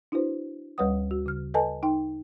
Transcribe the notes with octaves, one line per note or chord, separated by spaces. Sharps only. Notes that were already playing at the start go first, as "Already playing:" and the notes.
D4 E4 F#4 B4 C5
D2 G3 B4 C#5 F#5 D#6
F#4
C#3 F6
A4 B4 D#5 G#5 A5
D#4 G5 C6